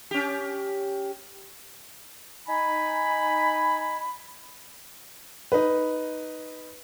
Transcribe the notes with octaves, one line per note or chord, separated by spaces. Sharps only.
C#4 G4
D#4 G#5 B5
D#4 B4